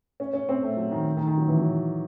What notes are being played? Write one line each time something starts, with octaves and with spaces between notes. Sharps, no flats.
C#4
C#4
C4
A3
F#3
D#3
D#3
D#3
F#3
E3
F#3